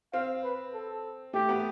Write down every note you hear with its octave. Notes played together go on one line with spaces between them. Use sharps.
C4 F5
B4
A4
A3 G4
B3